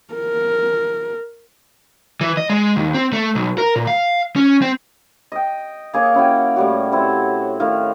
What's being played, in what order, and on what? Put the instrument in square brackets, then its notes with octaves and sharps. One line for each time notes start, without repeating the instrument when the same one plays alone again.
[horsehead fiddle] A#4
[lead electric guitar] E3
D#5
G#3
D#2
C4
A3
B1
A#4
A#2
F5
C#4
C4
[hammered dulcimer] D#5 G5
A#3 G#4 C#5 C#6
C#4 E4 F#4 G5
A2 G3 F#4
C4 E4 F#4
A2 D#3 F5